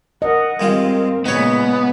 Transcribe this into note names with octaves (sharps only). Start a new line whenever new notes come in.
A#4 D#5 F#5
G2 G#3 C4 F4 A#4
A#2 C#3 G#3 B3 D#4 C#5